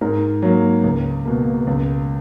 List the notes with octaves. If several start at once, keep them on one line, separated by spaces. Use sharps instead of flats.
G#2 A#4
F#3 A#3
C#2
B2 A#3
C#2